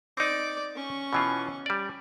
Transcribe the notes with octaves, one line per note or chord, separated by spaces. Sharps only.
C4 D#4 D5 D6
C#4 C#6
B2 E3 F4
G3 D5